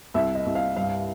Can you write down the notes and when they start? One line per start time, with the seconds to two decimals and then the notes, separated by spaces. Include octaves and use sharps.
0.14 C2 E5
0.35 D#5
0.46 C2
0.55 F5
0.76 G2 F5